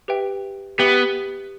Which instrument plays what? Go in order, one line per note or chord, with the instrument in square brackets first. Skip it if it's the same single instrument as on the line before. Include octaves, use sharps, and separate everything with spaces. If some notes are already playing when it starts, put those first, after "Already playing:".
[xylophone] G4 B4 E5 G5
[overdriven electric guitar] B3 [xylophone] G4 B4 E5 G5